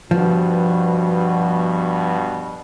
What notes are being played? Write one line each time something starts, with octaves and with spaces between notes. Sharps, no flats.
G2 B2 F3